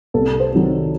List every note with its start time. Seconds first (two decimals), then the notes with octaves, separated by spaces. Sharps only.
0.14 C2 A4
0.40 C5
0.53 C3 D#3 F#3